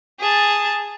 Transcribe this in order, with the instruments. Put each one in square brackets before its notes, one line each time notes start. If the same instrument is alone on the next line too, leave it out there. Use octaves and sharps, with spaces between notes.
[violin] G#4 A5